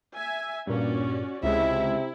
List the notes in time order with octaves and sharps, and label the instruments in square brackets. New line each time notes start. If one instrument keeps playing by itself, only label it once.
[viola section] E5 G#5
[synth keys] G2 A#2 [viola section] C#4 F#4 D5
[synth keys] C#2 G#3 [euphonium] C3 [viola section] E4 [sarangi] E5